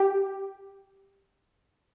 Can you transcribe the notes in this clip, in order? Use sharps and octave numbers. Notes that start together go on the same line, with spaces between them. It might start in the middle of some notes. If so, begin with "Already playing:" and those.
Already playing: G4